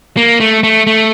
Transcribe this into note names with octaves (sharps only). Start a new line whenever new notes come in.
A#3
A3
A3
A3